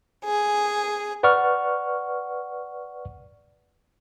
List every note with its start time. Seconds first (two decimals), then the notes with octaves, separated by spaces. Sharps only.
0.25 G#4
1.23 B4 D5 F#5 C#6 F6